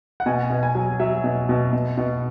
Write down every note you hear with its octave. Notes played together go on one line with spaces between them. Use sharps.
F#5
B2 G#5
B2
G#5
F#3
F#3 E5
B2
B2
B2
B2